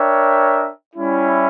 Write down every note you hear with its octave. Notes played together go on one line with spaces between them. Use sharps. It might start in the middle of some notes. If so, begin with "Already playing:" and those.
Already playing: D4 A#4 C#5 E5 G5
G3 C#4 E4